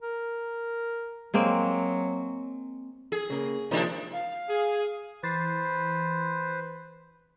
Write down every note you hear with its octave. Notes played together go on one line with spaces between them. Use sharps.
A#4
F#3 G#3 A#3 C4
G#4
C#3 A#3
C3 D#3 F3 G#3 A#3 D4
F5
G#4
E3 B4 C5 A6 C7